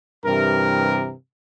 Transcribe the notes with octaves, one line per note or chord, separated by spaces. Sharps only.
G2 C3 E3 G4 A#4